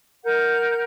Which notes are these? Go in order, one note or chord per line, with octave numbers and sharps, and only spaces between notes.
A#4 F#5 G6